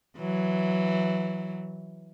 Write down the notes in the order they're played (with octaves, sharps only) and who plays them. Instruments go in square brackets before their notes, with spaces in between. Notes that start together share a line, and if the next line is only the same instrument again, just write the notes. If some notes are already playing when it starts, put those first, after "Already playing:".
[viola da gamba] E3 F#3